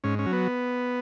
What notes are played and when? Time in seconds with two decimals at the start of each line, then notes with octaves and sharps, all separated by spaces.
0.04 G#2 C#4
0.19 C#4
0.26 F#3
0.33 B3